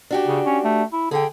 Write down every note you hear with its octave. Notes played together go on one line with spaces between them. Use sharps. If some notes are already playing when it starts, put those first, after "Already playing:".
D4 F#4 G4
C#3
C#4
A3
E4
D3 G#4 G5